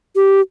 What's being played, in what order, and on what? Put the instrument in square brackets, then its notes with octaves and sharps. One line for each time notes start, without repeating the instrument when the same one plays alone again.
[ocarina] G4